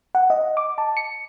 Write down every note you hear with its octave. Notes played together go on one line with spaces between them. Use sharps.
F#5
D#5
D6
A5
C#7